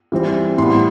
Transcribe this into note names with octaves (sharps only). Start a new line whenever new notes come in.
E3 G3 C4
A2 G3 B3 C6